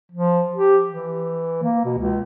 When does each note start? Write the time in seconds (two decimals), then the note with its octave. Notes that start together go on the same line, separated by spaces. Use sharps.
0.12 F3
0.56 G4
0.88 E3
1.62 A#3
1.85 B2
1.98 C#2